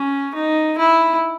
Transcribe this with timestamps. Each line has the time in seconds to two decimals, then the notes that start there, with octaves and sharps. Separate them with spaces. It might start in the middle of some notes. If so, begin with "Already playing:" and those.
Already playing: C#4
0.35 D#4
0.78 E4